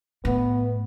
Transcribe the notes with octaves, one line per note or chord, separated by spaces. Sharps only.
A2 B3